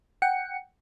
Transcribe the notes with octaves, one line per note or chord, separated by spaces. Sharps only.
F#5 G5 C#7